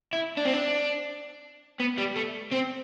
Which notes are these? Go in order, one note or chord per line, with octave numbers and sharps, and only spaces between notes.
E4
D4
C4
D4
B3
G3
A3
C4